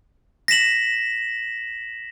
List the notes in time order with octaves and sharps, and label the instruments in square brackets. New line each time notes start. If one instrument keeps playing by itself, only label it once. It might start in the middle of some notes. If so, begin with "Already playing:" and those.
[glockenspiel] A#6 B6 E7 F#7